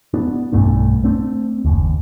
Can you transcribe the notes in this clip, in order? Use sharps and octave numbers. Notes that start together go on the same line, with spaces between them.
B3 D4
B1 G2 A3 D4
A3 C4 D4
F#1 D#2